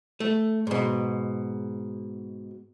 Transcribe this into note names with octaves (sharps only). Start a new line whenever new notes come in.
A3
G#2 B2